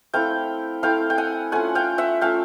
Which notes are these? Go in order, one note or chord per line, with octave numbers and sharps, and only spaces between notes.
A3 C4 E4 F5 G5
A3 C4 E4 F5 G5
G5
F#5 G#5
A3 C#4 F4 F#5 G#5
F5 G5
E5 F#5
A3 C#4 F4 F5 G5